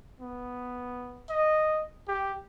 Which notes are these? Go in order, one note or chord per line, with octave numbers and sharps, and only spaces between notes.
B3
D#5
G4